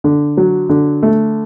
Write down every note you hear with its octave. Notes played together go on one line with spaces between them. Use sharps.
D3
F#3
D3
A3